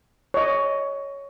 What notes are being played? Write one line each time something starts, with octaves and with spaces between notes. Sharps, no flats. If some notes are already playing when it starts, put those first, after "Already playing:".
C#5 D#5